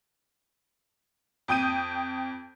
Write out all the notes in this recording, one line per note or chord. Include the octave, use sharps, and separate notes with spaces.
F2 G5 D#6 G6 D#7